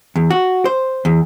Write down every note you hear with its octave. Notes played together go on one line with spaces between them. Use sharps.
E2
F#4
C5
E2